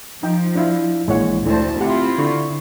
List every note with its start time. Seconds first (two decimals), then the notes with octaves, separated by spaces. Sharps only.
0.23 F3 D#4 G5
0.55 D4 E4 F5
1.08 A#1 A#2 E3 G#3 E4 C#5 F#5
1.46 D2 A3 E4 C5 A5
1.80 C4 E4 F4 G4 F#5
2.18 D3 C#6